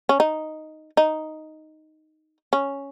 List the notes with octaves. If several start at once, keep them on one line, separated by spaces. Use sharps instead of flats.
C#4
D#4
D#4
C#4